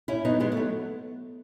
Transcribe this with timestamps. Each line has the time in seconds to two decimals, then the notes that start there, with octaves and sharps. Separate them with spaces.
0.08 A2 C#4 E4
0.25 F#3 B3 D#4
0.40 F#3 G#3 B3
0.52 A3
0.57 F#3